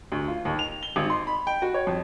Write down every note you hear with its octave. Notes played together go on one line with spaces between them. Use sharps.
D2
F4
D#2
F7
G7
G#1
C6
B5
G5
F#4
C#5
F2